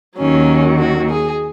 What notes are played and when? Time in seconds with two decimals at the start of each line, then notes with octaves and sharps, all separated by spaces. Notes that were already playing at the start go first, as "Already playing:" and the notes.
0.18 D#2 D#3 F#3 C#4
0.79 F#4
1.10 G#4